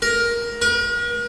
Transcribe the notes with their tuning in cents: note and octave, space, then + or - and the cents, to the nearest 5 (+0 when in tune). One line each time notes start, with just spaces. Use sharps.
A#4 +15
A#4 +45